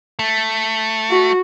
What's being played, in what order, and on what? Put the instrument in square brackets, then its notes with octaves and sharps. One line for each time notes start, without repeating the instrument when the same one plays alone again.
[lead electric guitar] A3
[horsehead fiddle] F#4